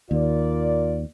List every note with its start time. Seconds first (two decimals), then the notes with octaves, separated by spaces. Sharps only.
0.11 D#2 F4 A#4 D5